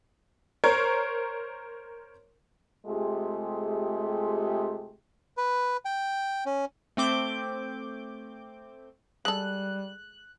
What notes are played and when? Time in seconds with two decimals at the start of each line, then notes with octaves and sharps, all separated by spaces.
0.64 A#4 C5 C#5
2.86 C3 G#3 A3 F4 G4 G#4
5.37 B4
5.85 G5
6.46 C#4
6.97 A3 C4 D6 G6
9.25 G3 G#3 A4 F#6